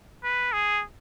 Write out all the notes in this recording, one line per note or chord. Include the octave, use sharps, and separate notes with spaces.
B4
G#4